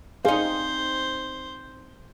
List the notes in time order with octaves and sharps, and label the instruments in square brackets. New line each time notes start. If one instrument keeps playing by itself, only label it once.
[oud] C4 D#4 [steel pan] G#4 F5 [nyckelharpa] C5